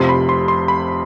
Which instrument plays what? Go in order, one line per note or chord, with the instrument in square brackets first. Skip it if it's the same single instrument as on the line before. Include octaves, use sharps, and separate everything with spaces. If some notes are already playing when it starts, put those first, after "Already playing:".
Already playing: [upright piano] F1 F2 C3 [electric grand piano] C6
[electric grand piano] B5
C6
C6
B5